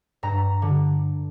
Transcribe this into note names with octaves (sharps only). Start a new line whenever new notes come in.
G2 A#5
D3